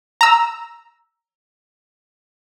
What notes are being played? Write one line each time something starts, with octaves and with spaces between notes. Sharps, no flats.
A#5 E6